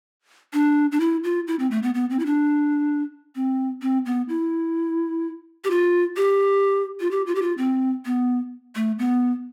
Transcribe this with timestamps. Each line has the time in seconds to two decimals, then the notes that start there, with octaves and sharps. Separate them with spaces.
0.53 D4
0.92 D4
1.00 E4
1.24 F4
1.47 E4
1.59 C4
1.71 A3
1.83 B3
1.95 B3
2.10 C4
2.19 E4
2.26 D4
3.35 C4
3.82 C4
4.06 B3
4.29 E4
5.64 G4
5.70 F4
6.17 G4
7.01 F4
7.11 G4
7.26 F4
7.35 G4
7.42 F4
7.58 C4
8.05 B3
8.75 A3
8.99 B3